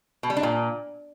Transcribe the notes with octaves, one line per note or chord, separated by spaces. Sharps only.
B2
G3
D4
A#2